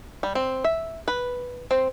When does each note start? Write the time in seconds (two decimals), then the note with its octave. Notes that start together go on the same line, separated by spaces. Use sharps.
0.23 G3
0.35 C4
0.64 E5
1.08 B4
1.71 C4